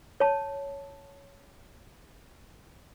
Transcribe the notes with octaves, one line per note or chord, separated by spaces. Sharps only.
C#5 A5